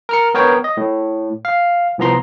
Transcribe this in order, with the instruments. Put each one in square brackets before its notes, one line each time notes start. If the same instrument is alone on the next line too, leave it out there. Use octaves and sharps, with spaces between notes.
[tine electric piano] A#4 F6 C#7
B3 A#4 C#5 G5
D#5
A2
F5
C2 F3 B3 A#5 C6